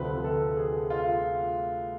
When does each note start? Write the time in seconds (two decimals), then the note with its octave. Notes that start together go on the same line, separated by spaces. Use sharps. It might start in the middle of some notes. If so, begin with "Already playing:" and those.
Already playing: D2 C3 F3 A3 B4
0.24 A4
0.57 G#4
0.90 F4